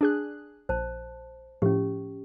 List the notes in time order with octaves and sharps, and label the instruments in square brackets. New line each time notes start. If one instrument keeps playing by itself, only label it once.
[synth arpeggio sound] D4 G#4 F#6
[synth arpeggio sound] A#1 [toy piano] C5 A5
[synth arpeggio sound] A2 F3 [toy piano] C#4 G4